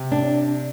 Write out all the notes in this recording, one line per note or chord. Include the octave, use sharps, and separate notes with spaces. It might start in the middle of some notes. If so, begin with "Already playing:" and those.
Already playing: C3
D4